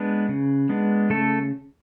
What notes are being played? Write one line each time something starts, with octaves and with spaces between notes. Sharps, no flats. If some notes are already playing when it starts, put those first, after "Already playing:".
Already playing: G#3 B3 D4 B4
C#3
G#3 B3 D4
C#3 A3 A4